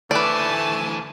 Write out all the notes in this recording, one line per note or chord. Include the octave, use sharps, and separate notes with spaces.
D2 E3 A3 B4 D5 G#5 A5